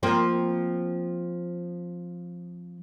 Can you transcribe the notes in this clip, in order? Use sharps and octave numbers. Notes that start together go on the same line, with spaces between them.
F3 A#3 C4